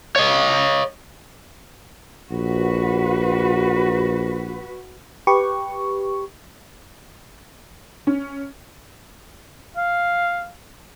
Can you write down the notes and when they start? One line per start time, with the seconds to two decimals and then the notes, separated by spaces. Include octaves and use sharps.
0.16 C#5 D#5
2.32 A#1 F#4 B4
5.27 G4 B4 C#6
8.07 C#4
9.77 F5